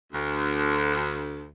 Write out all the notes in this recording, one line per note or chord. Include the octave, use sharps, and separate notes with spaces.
D2